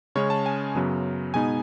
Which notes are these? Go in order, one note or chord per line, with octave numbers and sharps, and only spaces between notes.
C#3 G#3 C#4 C#5
A5
G#5
F#2 C#3 F#3 B3
B2 G#3 B3 D#4 G#5